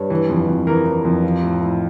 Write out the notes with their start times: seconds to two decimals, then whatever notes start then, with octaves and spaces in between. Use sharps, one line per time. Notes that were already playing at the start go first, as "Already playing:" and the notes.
Already playing: G2 C#5
0.10 E3
0.30 F2
0.48 F2
0.67 E3 A#4
0.86 E3
1.05 F2
1.23 F3
1.43 A2
1.61 A2